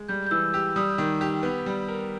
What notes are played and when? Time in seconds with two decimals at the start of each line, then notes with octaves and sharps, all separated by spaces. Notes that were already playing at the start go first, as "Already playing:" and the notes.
Already playing: G#3
0.08 G3 G6
0.26 G6
0.31 E3 E6
0.53 G4 E6
0.76 G3 D#6
0.98 D#3
1.21 G4
1.43 B3
1.66 G3
1.88 A#4